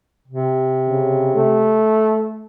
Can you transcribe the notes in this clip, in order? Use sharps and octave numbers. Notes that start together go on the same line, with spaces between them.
C3
C#3
A3